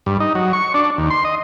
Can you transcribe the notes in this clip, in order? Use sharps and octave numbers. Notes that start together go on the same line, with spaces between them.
G2
D#4
F#3
C#6
D4
D#2
C6
D#5